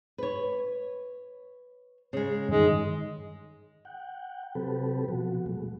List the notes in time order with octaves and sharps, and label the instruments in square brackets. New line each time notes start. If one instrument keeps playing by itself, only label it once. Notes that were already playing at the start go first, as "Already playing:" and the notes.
[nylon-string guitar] B4 C#5
C#3 G#3
[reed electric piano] G2 D#3 [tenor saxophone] G#3
[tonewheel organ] F#5 G5
C3 F#3 C4 G4 A4 B4
B2 F3 F#4
B2 F#3 G#3 A3